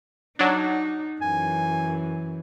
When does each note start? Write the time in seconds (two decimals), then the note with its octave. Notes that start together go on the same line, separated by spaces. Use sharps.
0.39 F#3 D4 D#4
1.22 F#2 E3 G#5